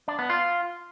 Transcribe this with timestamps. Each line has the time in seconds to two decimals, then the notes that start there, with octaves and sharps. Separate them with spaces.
0.08 D4
0.19 B3
0.30 F4